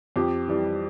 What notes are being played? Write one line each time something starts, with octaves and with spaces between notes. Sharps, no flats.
F2 G4
E3 G3